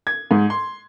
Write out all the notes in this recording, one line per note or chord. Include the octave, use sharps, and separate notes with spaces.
G#6
G#2
C6